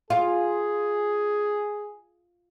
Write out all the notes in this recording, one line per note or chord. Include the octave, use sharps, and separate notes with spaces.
F4 G#4